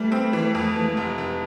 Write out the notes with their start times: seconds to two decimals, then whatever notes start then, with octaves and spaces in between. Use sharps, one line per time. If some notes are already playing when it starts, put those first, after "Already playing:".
Already playing: E3 G3 A3
0.12 C4
0.33 E3
0.55 F2
0.76 E3
0.97 F1
1.18 F1